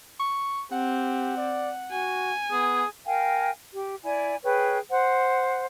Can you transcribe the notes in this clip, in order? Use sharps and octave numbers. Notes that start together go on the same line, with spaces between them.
C#6
C4 G4 F#5
D5
F#4 G#5
B3 G#4
A#4 F5 G5 G#5
G4
E4 D5 G#5
G#4 B4 C#5 G5
C5 F#5